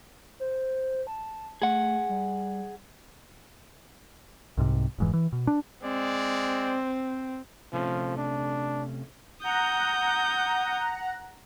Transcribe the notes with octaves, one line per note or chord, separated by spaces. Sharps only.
C5
A5
A3 G#4 F#5
G3
C2 G#2 C3
F1 G#2 E3
E3
B2
D4
G#3 C4 D5
C3 F3 A3 C#4
D4
F#5 A#5 D#6 G6